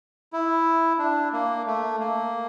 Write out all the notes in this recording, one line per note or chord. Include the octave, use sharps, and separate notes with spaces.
E4
D4
A#3
A3
A#3